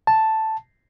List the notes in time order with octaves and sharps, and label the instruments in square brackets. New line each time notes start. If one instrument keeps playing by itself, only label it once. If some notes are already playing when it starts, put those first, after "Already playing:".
[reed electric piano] A5